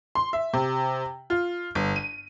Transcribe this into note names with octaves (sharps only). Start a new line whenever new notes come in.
C6
E5
C3
F4
G1
D#7